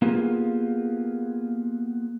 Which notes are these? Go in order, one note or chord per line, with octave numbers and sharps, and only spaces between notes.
A#3 B3 F4 G4 G#4